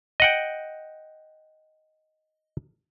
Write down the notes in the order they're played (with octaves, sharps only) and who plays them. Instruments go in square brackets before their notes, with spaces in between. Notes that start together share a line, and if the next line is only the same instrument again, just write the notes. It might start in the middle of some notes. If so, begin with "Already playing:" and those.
[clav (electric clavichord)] D#5 F#5 G5